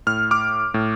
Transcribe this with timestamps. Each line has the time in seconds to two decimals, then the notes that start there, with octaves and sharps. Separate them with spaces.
0.07 A2 F6
0.31 D6 F6
0.74 A2